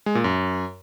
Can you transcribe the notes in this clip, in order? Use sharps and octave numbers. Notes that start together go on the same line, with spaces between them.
G#3
A#2
F#2